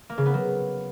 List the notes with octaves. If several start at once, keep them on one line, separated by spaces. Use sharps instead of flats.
A#3
C#3
B3
F#3